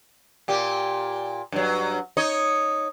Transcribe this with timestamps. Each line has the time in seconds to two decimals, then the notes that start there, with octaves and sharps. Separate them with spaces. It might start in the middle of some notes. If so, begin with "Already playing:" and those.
0.48 A#2 G4
1.52 G2 F#3
2.17 D#4 C#5 D#5